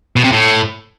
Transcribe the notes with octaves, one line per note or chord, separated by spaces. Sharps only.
B2
C3
A2